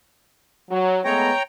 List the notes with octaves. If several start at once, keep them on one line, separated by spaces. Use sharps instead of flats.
F#3
G#3 A3 B3 C#5 G5 A#5